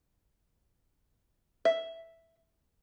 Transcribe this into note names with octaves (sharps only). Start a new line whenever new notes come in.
E5